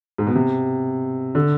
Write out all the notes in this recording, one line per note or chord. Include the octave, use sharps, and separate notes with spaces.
G#2
B2
C3
D3